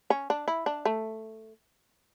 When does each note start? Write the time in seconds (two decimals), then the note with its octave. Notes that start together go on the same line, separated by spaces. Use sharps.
0.10 C#4
0.30 D4
0.48 E4
0.66 D4
0.85 A3